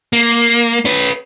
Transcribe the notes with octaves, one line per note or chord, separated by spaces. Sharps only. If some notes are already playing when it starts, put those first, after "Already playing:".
A#3
C#4 B4